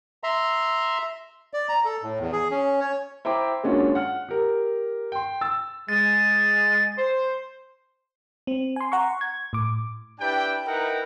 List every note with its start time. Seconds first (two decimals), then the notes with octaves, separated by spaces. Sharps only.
0.24 E5 A#5 C6
1.54 D5
1.69 A#5
1.85 A4
2.03 A2
2.19 E2
2.32 G#4
2.51 C#4
2.81 C#5
3.25 E4 C5 G5 A#5 D6
3.64 G#3 A#3 C#4 D4 F4 F#4
3.95 F#5 F6
4.29 G4 A#4
5.12 G5 C6
5.41 E6 A6
5.89 G#3 A6
6.97 C5
8.47 C4
8.76 G#5 C6
8.92 F#5 A#5 C6 C#6
9.21 G#6
9.53 A2 D6
10.20 D4 E4 G4 B4 G5
10.66 D#4 E4 A#4 B4 F#5 G5